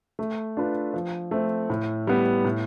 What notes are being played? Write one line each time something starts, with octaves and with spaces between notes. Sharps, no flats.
A3
D4 F4 B4
F3
A3 C4
A2
G3 B3
A2